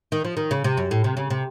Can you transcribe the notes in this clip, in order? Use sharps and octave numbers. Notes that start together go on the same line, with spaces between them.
D#3
F3
D#3
C#3
C3
F#2
A2
C3
C#3
C3